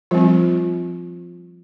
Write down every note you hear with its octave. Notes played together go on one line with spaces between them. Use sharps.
F3 G3 C4 F4